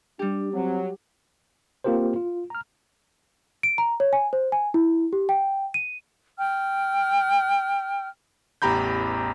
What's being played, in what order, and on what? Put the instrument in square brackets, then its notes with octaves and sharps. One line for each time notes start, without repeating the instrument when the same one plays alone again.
[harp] G3 G4 [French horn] D4
[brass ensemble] F#3 [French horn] C4
[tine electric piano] A#3 C4 F4 G4 A#4 C5
F4
A#5 F6
[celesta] D7
A#5
C#5
G#5
C5
G#5
E4
G4
G5
D#7
[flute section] G5 F6
[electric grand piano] A1 E2 G4 A#5 B5 G6